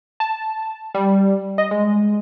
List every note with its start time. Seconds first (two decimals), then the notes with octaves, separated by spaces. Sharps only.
0.20 A5
0.94 G3
1.58 D#5
1.71 G#3